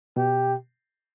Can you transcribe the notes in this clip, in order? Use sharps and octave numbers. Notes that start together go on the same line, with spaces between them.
B2 G4